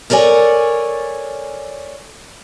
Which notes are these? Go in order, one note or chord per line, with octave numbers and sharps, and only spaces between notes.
A4 A#4 C#5 D5 G#5